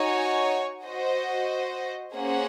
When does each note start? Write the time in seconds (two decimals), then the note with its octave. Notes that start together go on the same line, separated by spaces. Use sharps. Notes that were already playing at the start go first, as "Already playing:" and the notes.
Already playing: D#4 F#4 C#5 G#5
0.84 F#4 C5 D#5
2.14 A#3 C#4 G#4 C5 F#5